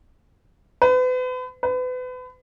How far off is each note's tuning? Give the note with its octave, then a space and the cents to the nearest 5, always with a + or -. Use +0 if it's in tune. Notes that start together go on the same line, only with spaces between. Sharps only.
B4 +40
B4 +35